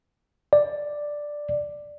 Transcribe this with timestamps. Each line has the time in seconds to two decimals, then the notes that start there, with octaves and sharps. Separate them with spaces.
0.53 D5